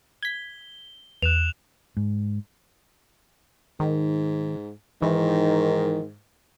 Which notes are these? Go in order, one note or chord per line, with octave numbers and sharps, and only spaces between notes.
G#6 B6 G7
E2 F#6 E7 F7
G#2
G#2 D#3
G#2 D#3 E3